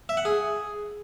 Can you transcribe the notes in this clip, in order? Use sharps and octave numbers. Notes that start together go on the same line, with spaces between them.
E5
F#5
G#4